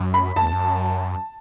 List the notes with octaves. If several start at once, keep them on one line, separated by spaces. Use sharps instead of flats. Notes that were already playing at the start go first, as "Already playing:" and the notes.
Already playing: F#2
B5
F#2 A5
E2
F#2